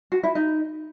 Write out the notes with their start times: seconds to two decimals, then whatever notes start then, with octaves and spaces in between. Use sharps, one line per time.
0.12 F#4
0.23 E4
0.35 D#4